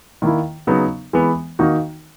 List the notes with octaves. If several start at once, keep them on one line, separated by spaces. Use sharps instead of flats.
D#3 A#3 E4
C#3 F#3 B3 D#4
E3 G#3 B3
D#3 A#3 D#4 F#4